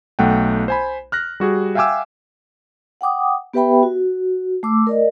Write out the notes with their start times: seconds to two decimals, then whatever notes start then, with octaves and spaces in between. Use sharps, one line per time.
0.19 B1 A3 F#5 G5
0.68 C5 G#5 B5
1.12 F6 F#6 A#6
1.40 G3 F#4 G#4
1.75 E5 F5 G5 G#5 D6 E6
3.01 F#5 G5 D6 D#6
3.54 B3 G4 B4 E5 G5 B5
3.83 F#4
4.63 A3 D6 E6
4.87 A#4 D5 D#5